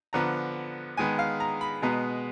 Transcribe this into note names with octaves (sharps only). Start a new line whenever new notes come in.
D3 F3 B3 A#5
D#3 G#3 B3 G#5
F5
A#5
B5
B2 G#3 B3 A#5